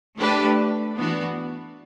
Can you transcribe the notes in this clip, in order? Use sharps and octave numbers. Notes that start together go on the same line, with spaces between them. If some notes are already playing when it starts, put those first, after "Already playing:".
A3 D4 G4 B4
E3 B3 D4 F#4